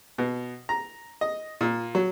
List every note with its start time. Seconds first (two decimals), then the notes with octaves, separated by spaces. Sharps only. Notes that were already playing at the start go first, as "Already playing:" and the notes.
0.18 B2
0.69 A#5
1.21 D#5
1.61 A#2
1.95 F#3